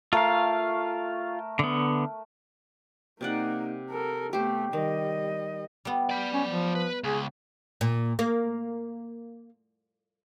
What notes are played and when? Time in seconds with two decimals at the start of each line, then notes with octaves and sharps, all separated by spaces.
0.13 A3 F4 A#4 F5
1.59 D3 B3
3.21 C3 A#3 D#4 D5 F#5
3.90 A4 A#4
4.33 A3 B3 G4 C5
4.73 D#3 G3 D#5
5.85 G3 B3
6.10 D5 B5
6.34 C#4
6.48 F3
6.75 B4
7.04 C#2 G#4
7.81 A#2
8.19 A#3